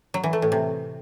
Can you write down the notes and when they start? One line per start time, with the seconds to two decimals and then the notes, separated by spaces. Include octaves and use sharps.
0.14 F#3
0.24 E3
0.33 A3
0.42 A2
0.52 C3